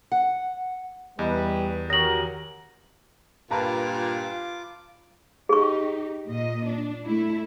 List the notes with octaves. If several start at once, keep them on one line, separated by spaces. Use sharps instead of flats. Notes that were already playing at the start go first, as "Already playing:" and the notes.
F#5
E2 G3 B4 D#5
D#3 F#4 G4 A#4 C#6 A#6 F#7
G2 A#2 F4 B4 A5 A#5 D6
D#4 G4 G#4 C#6
A#2 D#5
D4
A3 E4